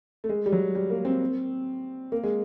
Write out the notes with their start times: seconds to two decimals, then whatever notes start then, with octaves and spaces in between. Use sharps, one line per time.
0.24 A3
0.29 G#3
0.46 G3
0.52 F#3
0.75 G3
0.90 A#3
1.05 C4
2.12 A#3
2.23 G#3